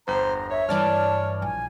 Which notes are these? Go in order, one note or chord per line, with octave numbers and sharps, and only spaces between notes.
G1 E2 C5 A#5
C#5 E5
G2 E3 D5 A5 F6
A#1 G#5